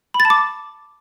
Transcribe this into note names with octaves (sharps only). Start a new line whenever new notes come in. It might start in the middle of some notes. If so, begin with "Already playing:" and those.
B5
A6
A5
D6